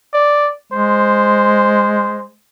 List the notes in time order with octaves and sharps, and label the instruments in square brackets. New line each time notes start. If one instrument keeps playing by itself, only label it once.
[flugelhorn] D5
[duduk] G#3 [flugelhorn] C5